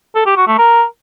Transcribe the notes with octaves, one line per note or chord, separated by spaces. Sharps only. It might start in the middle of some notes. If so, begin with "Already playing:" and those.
A4
G4
F#4
A3
A#4